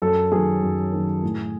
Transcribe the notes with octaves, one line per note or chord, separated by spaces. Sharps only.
F#2 A4
D#3 F#3 G#4
F#2
D#3 F#3
A2